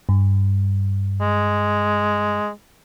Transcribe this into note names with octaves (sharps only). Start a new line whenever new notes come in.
G2
G#3